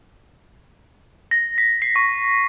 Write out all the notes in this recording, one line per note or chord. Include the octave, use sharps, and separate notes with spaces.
A#6
B6
C7
C#6